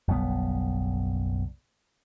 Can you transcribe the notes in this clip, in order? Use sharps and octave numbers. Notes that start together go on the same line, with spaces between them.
F#1 B1 G3 B3